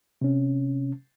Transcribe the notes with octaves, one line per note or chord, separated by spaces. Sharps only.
C3 C#4